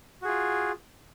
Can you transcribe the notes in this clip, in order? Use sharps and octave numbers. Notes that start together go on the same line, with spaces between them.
F4 F#4 G#4